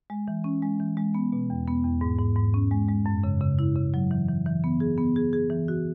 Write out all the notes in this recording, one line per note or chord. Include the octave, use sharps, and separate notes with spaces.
G#3
E3
C#4
G#3
E3
G#3
B3
B2
E2
B3
E2
G#2
G#2
G#2
C#4
G#3
G#3
F#2
C#3
C#3
E4
C#3
F#3
E3
E3
E3
B3
G#4
B3
G#4
G#4
E3
F#4